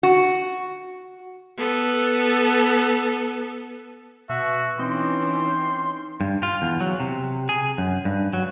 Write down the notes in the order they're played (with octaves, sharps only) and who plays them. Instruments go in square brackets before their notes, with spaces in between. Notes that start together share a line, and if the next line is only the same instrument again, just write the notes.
[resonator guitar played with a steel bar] F#4
[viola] B3 A4
[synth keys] B2 [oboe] F#4 [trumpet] E5
[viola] E3 C#4 [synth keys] C4 D#4 [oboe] G5 [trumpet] C6
[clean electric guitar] G2
F4
E2
F#3
C3
G#4
F#2
G2
F#3